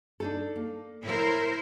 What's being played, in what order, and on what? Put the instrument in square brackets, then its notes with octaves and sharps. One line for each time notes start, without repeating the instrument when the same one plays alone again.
[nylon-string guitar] D4 D#4 A4
A#3
[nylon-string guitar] A2 [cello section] E4 A#4 C5